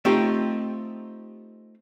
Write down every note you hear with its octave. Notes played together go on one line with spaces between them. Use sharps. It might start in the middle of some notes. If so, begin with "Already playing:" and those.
A3 C4 D#4 F4 G4